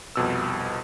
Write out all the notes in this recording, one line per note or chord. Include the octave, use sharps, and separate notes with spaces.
C2 F2 B2 E6